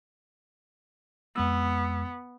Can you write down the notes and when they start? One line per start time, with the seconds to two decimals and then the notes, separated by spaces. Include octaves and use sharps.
1.36 F2 G#3 B3 E6